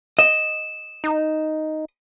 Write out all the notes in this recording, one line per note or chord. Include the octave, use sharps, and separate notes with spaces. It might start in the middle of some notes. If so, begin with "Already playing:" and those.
D#5 E7
D#4